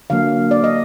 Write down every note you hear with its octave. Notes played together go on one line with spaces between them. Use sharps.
D3 F#3 A#3 F5
D5
D#5